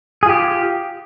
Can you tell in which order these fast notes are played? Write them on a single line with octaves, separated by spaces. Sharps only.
G#4 F4 G4